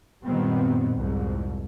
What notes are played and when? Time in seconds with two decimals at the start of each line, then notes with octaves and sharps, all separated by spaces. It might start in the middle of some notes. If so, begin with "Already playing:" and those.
0.24 F#2 A#2 D#3 G3 B3 C4
0.94 C2 F2 G#2